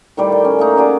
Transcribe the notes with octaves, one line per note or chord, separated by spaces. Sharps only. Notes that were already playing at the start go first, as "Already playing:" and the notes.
A2 D#3 G3 D5
G5
C#4
A3 A#3 D#4
C#4 F#4 G#4 D5